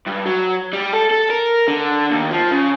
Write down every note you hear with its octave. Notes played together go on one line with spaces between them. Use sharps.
G2
F#3
G3
A4
A4
A#4
D3
D#2
F3
C#3